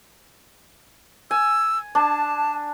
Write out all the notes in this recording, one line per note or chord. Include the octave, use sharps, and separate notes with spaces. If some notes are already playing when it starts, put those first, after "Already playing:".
G#5 E6
D4 A5